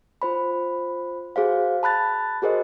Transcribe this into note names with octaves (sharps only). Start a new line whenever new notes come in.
F4 C5 B5
F#4 G#4 C5 F5
A5 B5 F#6 A6
F#4 G#4 A#4 C5 D#5